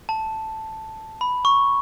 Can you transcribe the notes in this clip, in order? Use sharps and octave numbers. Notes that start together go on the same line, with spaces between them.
A5
B5
C#6